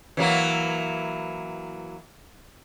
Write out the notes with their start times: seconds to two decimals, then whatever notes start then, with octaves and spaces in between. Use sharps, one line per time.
0.17 E3 F#3 A#3